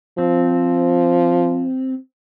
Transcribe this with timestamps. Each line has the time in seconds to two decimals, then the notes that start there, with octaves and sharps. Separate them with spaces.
0.18 F3 C4